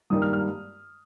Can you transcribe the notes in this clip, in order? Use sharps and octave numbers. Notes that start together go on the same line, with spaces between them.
G2 D#3 G3 A#3 D#6
F6
F6